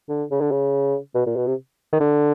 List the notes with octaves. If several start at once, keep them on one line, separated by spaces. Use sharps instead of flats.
D3
C#3
D3
C#3
B2
A#2
B2
C3
D#3
D3